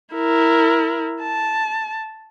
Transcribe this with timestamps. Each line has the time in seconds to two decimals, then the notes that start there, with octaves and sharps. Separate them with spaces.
0.15 E4 A#4
1.21 A5